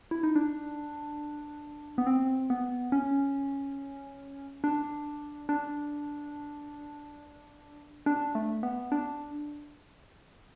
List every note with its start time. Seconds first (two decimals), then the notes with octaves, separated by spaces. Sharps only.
0.11 E4
0.23 D#4
0.36 D4
1.98 B3
2.07 C4
2.50 B3
2.92 C#4
4.64 D4
5.49 D4
8.06 D4
8.35 A3
8.63 B3
8.92 D4